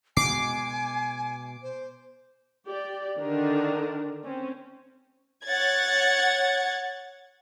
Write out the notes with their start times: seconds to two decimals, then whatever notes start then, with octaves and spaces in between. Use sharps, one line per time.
0.17 B2 G#3 G#5 D6 C7
1.62 C5
2.67 G4 D5
3.18 D3 D#3 D4 A#4
4.24 C4 C#4
5.46 C#5 F#5 G#6 A6